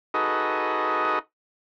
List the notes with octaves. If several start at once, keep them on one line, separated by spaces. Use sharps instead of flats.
D#4 F#4 G#4 A4 B4 D#5